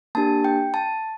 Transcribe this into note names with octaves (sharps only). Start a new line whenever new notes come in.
A#3 D4 G4 A5
G5
A5